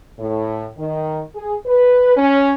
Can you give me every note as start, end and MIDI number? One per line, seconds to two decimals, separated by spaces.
0.19 0.66 45
0.78 1.20 51
1.35 1.55 68
1.66 2.16 71
2.17 2.52 61